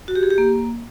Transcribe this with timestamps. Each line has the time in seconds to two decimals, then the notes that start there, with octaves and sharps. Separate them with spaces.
0.08 F#4
0.15 G4
0.23 G#4
0.30 G4
0.38 A#3